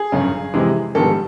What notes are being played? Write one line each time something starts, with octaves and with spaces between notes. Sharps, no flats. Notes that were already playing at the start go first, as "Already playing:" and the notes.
Already playing: G#4
G1 F#2 C#3
F2 C3 E3 G#3
A#1 G#2 D#3 G3 B3 A4